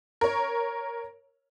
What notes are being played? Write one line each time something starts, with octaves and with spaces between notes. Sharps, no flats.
A#4 C#5